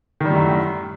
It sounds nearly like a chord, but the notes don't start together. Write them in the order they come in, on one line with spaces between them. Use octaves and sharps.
D#3 G3 A2 F#2